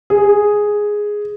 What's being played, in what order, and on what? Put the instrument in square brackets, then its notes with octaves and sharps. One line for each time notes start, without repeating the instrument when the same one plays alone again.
[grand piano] G#4